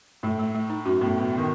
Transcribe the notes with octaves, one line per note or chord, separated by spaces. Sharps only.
A2 A3
A3
A3
D#4
F#2 F#4
A2 B3
B2 B3
D#3 B3